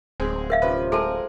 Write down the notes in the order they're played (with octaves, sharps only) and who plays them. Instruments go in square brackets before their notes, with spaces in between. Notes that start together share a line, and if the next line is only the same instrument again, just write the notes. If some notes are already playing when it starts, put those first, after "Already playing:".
[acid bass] D1 [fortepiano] G#3 C4 G#4
[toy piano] A#4 E5 F5
[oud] C3 F3 C#4 [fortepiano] B4
[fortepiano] G#3 A#4 [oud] C4 F4 [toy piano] A4 A5